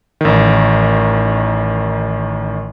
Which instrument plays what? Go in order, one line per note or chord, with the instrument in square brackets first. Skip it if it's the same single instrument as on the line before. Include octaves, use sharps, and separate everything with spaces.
[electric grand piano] A1 D#3